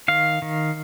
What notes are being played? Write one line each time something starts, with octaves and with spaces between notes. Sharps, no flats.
D#3 F5
D#3